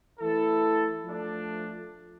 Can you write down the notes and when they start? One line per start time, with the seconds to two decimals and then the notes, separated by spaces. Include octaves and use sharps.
0.20 E3 A3 E4 A4
1.06 F3 A3 D4